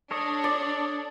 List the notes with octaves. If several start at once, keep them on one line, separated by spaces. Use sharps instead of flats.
D4 A4 C#5 D#5
D5